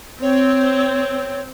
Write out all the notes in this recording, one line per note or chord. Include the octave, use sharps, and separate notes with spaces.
C4 C#5